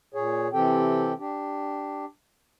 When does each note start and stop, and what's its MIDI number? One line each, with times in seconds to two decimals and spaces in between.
0.14 0.48 46
0.14 0.48 68
0.14 0.48 73
0.53 1.13 48
0.53 1.13 52
0.53 1.13 60
0.53 1.13 67
0.53 1.13 69
0.53 1.13 79
1.19 2.05 62
1.19 2.05 67